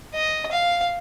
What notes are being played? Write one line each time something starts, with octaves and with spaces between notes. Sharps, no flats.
D#5
F5